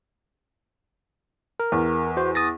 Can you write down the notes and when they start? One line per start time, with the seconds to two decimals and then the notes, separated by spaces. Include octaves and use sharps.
1.60 A#4
1.72 E2
2.17 F#4 C5
2.35 D#6 A6 A#6